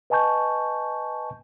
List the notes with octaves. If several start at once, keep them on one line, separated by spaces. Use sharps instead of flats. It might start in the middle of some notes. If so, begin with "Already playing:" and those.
B4 D#5 G#5 A5 C#6 G6